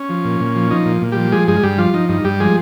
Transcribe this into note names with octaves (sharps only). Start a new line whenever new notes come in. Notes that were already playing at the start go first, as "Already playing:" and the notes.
Already playing: C#4
F3
A#2
A#2
F3
F3 D#4
A#2
A#2
F3 G3 G4
F3 G#3 G#4
G2 G#3 G#4
G2 G3 G4
F3 F4
F3 D#4
G2 D#4
G2 G3 G4
F3 G#3 G#4